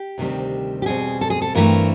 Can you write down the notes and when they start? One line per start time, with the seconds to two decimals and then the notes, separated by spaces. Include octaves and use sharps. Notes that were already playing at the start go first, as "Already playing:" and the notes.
Already playing: G4
0.18 D2 C3 D#3 G3 C4
0.82 G4
0.86 E2 B2 G3 C4 G#4
1.21 A4
1.30 G#4
1.42 A4
1.55 G2 E3 A3 C4 A#4